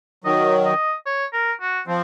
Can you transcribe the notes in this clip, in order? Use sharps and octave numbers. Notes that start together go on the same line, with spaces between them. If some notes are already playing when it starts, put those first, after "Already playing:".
D#3 F#3 D#5
D#5
C#5
A#4
F#4
F3 C4